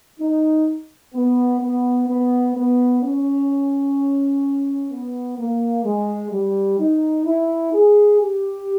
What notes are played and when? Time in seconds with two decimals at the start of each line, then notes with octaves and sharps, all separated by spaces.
0.20 D#4
1.14 B3
1.61 B3
2.09 B3
2.55 B3
3.03 C#4
4.91 B3
5.38 A#3
5.85 G#3
6.32 G3
6.79 D#4
7.26 E4
7.73 G#4
8.20 G4